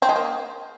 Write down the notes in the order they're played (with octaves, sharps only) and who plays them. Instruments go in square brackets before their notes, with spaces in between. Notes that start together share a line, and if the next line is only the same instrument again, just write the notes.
[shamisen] C4
G#3
A#3